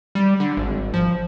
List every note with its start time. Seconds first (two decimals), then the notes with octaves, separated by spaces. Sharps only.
0.15 G3
0.40 D3
0.57 G#1
0.94 F3